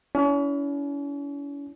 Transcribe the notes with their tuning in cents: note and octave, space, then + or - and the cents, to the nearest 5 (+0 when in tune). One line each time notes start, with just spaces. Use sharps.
C#4 +40 E4 +0